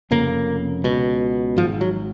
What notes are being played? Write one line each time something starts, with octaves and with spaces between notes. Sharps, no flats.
F1 F2 C#3 A#3
C#2 B2
G#1 G#2 F3
F#3